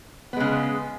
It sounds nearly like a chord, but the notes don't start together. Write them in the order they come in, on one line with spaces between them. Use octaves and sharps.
B3 G#3 C#3